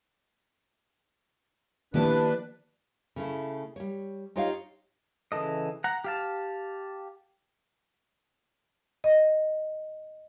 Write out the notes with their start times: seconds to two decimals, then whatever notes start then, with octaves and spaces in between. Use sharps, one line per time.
1.94 D#3 F3 A#3 B3 D4 E4 G4 B4
3.16 C#3 A3 E4
3.76 G3 C#5
4.36 D#4 F4 G4 C#5 D#5 F5
5.32 C#3 E3 A4 D#5
5.84 F#5 A#5
6.04 G4 F5 A5
9.04 D#5